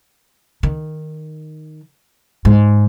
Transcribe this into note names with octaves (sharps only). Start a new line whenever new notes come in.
D#3
G#2